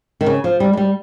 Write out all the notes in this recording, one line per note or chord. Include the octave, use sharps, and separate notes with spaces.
D#3
C#3
F3
G3
G#3
G3